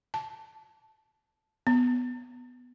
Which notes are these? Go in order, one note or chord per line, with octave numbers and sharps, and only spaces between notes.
A5
B3